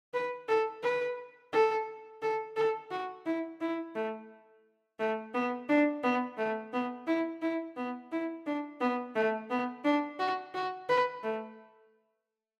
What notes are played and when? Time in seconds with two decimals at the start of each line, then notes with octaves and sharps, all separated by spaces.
0.14 B4
0.48 A4
0.83 B4
1.52 A4
2.22 A4
2.56 A4
2.91 F#4
3.26 E4
3.61 E4
3.95 A3
4.99 A3
5.34 B3
5.69 D4
6.03 B3
6.38 A3
6.73 B3
7.07 E4
7.42 E4
7.76 B3
8.11 E4
8.46 D4
8.81 B3
9.15 A3
9.50 B3
9.84 D4
10.19 F#4
10.54 F#4
10.89 B4
11.23 A3